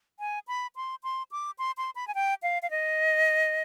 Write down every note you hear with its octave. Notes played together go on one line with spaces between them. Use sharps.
G#5
B5
C6
C6
D6
C6
C6
B5
G#5
G5
F5
F5
D#5